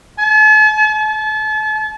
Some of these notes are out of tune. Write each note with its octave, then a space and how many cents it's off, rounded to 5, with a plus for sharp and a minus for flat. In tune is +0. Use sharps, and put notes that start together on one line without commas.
A5 -45
A5 -35